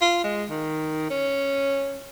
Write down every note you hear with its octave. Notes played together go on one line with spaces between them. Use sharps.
F4
G#3
D#3
C#4